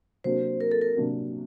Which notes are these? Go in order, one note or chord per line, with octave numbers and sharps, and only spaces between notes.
C3 F#3 A#3 D4 F#4 C5
A#4
A4
A#4
C3 F#3 A#3 D4 F#4